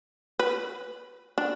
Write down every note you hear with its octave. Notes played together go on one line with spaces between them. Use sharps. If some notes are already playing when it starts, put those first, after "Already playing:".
B4
D4